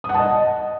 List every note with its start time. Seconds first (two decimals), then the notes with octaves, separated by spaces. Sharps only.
0.04 D#6
0.09 F#5
0.14 A5
0.19 D#5